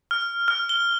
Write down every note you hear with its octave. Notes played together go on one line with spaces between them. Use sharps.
F6
F6
G7